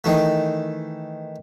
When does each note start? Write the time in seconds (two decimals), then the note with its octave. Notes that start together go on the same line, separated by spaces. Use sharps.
0.04 D#3 E3 A3